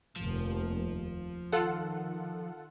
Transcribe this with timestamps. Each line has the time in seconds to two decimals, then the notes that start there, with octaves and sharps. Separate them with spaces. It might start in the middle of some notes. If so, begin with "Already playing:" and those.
0.16 F1 D#2 F3
1.52 D#3 F4 A4 F#5